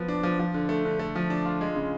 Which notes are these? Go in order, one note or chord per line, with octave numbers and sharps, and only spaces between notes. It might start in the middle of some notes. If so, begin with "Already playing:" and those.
Already playing: F3 B3
D4
F3
F3
D3
A3
D3
A3
F3
D4
F4
G#3
C#3